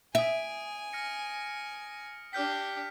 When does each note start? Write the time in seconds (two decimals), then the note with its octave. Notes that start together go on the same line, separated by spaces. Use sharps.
0.15 E5 G#5 D#6 D7
0.93 F6 A#6 C#7
2.33 D4 G4 F6 G6 B6